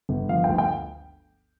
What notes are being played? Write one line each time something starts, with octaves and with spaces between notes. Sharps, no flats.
G1
F3 F5
D2 G5
G5